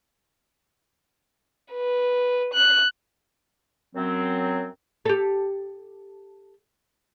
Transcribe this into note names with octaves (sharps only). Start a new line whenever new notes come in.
B4
F#6
F#2 F#3 C4
G4 A4